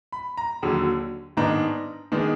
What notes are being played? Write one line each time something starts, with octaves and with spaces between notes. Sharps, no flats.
B5
A#5
D#2 D3 F#3
G#2 D#3 G#3 B3 D4 A#5
D#3 G#3 B3 D4